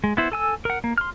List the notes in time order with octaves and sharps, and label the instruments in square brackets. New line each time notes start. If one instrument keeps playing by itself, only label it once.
[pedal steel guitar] G#3
B3 E4 C5
A4 G#5 E6
A#4 F#5
A#3
C6 F6